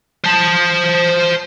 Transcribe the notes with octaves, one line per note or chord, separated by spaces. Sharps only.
C5 A5